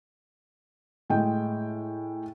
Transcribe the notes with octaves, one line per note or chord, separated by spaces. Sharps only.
A2 G#3 G5